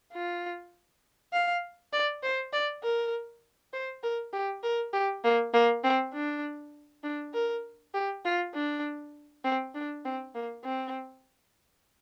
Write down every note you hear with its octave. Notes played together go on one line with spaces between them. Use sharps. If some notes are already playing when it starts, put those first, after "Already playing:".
F4
F5
D5
C5
D5
A#4
C5
A#4
G4
A#4
G4
A#3
A#3
C4
D4
D4
A#4
G4
F4
D4
C4
D4
C4
A#3
C4